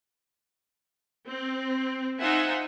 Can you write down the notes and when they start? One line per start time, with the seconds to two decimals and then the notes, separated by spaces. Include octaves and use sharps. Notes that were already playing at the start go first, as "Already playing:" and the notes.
1.28 C4
2.20 D#4 F4 C5 E5 F#5 G#5